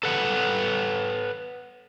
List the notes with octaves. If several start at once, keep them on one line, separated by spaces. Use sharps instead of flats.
A4 B4 F#5